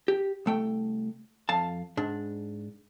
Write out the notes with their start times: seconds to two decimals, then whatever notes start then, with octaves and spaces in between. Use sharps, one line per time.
0.08 G4
0.46 C2 A3 G5
1.49 F2 F5 A5
1.97 G#2 D4